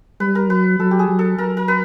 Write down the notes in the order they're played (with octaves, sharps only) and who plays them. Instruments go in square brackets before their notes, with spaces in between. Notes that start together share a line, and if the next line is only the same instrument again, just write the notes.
[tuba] G3 [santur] B4
[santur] A#4
[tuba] F#3 [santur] B4
[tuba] F#3 [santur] A4
[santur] G4
G#4
[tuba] F#3
[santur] A4
[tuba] F#3 [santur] A#4
[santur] A#4
B4